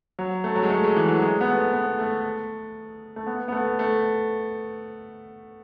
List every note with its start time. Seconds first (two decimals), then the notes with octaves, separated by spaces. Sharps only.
0.19 F#3
0.44 A3
0.56 F#3
0.63 G#3
0.70 A3
0.84 G#3
0.97 E3
1.08 F#3
1.22 G#3
1.41 B3
1.48 A3
1.73 B3
1.99 A3
3.16 A3
3.27 B3
3.48 B3
3.52 A3
3.79 A3